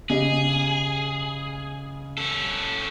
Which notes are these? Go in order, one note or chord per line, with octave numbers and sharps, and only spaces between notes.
C#3 G4 G#4 D#5
C#4 A4